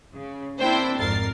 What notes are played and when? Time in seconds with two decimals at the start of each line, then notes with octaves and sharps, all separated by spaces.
0.16 C#3
0.58 A#3 C4 D4 E4 C5 G5
0.98 G#1 F2 A#4 A6 C7